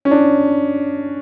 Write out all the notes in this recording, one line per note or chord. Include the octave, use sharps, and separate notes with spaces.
C#4
D4